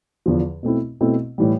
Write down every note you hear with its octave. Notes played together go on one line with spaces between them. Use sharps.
E2 D3 F3
B2 A3 C4 E4
B2 A3 C4 E4
A2 E3 G3